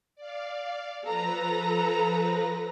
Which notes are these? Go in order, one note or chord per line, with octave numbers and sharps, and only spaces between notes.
D5 F5
F3 A4 B4 A#5 A#6